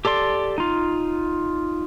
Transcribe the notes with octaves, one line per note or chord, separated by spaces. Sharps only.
G4 A4 D5 C6
D#4 F4